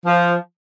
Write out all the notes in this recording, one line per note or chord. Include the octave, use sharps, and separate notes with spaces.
F3